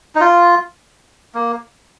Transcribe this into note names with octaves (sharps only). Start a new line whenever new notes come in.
D#4
F4
A#3